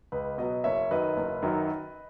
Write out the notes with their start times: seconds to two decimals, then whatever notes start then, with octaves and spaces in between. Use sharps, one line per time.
0.12 C#2 B4 D#5
0.38 B2 F#3 B4 D#5
0.64 F#1 C#5 E5
0.91 F#2 D#3 F#3 B4 D#5
1.17 F#1
1.42 F#2 D#3 F#3